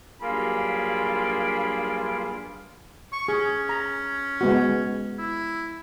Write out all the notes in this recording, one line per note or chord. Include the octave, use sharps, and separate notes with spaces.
G2 F#3 A#3 F4 G#4 B5
C#6
C#4 G#4
A#5
G#3 B3 F#4
E4